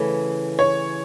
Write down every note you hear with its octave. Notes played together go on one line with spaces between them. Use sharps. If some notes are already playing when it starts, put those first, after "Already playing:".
Already playing: C#3 E3 A3 C#4
C#5